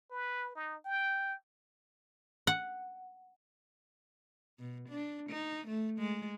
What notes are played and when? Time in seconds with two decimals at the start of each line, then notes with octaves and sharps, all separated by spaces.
0.11 B4
0.55 D#4
0.85 G5
2.47 F#5
4.59 B2
4.89 D4
5.30 D#4
5.68 A3
5.99 G#3